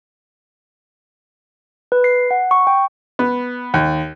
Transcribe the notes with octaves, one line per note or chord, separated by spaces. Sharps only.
B4
C7
F#5
C#6
G5
B3
D#2